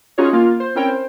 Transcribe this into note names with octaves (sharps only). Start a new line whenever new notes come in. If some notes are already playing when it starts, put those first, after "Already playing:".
C#4 D#4 F4 F#4 G#4 C#5
A#3 F4
C5
C4 C#4 E4 A#4 C#5 G5
C5